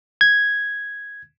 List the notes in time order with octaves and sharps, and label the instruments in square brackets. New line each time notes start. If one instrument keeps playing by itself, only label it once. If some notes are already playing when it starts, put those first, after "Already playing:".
[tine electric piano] G#6